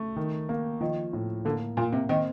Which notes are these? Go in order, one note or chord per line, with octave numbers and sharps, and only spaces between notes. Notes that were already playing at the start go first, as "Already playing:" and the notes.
Already playing: A3
D#3
A#3
D#3 F3
A2
D3 A#3
A#2 A#3
C3
D#3 C4